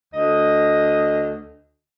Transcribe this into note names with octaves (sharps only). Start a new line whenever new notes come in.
D2 D#5